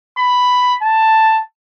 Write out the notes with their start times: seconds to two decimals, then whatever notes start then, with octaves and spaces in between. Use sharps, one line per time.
0.18 B5
0.82 A5